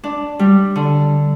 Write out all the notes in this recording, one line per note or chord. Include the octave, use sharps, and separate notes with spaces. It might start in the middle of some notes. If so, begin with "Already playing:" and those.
D4
G3
D3